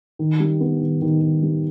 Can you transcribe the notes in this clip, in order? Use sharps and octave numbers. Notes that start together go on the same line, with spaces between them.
D#3
G3
B3
D#3
D#3
D#3
G3